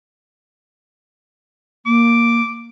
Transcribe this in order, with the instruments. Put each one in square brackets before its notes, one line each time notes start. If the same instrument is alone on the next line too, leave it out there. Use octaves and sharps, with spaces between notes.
[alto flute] A#3 [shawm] D6